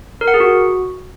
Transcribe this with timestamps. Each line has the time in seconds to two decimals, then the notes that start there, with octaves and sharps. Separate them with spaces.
0.21 A#4
0.28 F#5
0.34 G#4
0.40 F#4